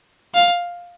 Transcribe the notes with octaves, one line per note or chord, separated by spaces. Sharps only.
F5